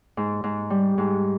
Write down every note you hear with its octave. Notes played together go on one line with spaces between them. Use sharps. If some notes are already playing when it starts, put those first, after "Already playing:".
G#2
G#2
G3
G#2